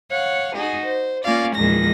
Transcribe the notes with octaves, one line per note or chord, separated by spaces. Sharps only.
C#5 F5 F#5
D#4 F#4 G#4
C5
A#3 C#4 F4 D5 F5
E2 A#2 D#3 F3 G#3 A#6